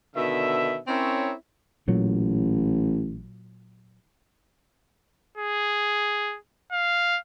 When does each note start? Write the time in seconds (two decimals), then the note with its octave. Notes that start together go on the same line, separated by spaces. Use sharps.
0.16 B2 D3 D#3 E5
0.87 C4 C#4 E4 A#4 C#5
1.88 A1 A#2 F#3
5.38 G#4
6.72 F5